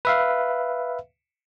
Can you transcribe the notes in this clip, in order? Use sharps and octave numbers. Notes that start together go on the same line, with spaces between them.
B4 E5 F5